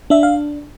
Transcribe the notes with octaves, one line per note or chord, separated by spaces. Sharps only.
D4 E5
F5